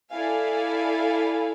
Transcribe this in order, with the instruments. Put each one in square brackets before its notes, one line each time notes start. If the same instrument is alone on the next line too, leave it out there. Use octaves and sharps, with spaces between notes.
[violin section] E4 A4 D5 F5 G#5